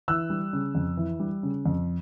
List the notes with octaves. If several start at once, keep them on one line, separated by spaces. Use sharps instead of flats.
E3 E6 F#6
G3
C#3
F2
E3
G3
C#3
F2